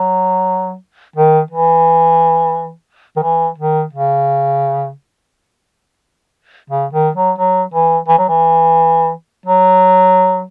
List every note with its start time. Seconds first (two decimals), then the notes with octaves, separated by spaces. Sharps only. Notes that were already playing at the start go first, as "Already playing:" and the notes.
Already playing: F#3
1.16 D#3
1.51 E3
3.16 D#3
3.23 E3
3.58 D#3
3.93 C#3
6.70 C#3
6.93 D#3
7.15 F#3
7.38 F#3
7.74 E3
8.08 E3
8.19 F#3
8.29 E3
9.46 F#3